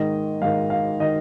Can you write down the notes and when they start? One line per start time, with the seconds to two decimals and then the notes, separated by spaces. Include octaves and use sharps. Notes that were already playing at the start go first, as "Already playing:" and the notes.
Already playing: G#2 D#3 D#5
0.42 G#2 D#3 F5
0.70 F5
1.00 D#3 D#5